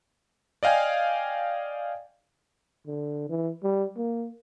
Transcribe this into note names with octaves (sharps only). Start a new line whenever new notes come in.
D5 D#5 F5 G5 G#5
D3
E3
G3
A#3